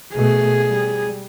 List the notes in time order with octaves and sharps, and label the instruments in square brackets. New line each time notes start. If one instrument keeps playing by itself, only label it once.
[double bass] B2 A3 [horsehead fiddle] G#4
[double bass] G3